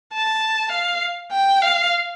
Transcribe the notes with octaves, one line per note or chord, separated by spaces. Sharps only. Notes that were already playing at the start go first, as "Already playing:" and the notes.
A5
F5
G5
F5